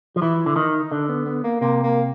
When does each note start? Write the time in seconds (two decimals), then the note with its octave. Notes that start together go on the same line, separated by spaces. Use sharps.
0.16 F3
0.22 E3 E4
0.46 D3
0.56 D#3 D#4
0.91 D3 D4
1.08 B3
1.26 B3
1.44 A#3
1.61 C3 A#3
1.83 A#3